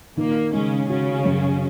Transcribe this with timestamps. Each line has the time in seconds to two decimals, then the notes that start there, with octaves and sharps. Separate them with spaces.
0.17 A#2 D#3 A#3
0.53 C#3 G#3 C#4
0.89 C#3 C#4 F#4
1.25 F#2